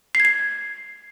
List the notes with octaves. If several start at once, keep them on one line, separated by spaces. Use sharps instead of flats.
C7
G#6
C7